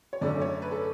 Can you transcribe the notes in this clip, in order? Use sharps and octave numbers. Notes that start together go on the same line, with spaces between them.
C#5
F#2 D3 A3 C#4 D5
C#5
B4
A4